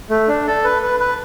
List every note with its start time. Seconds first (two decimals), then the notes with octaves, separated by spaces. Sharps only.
0.10 A3
0.28 D4
0.47 A4
0.64 B4
0.82 B4
1.00 B4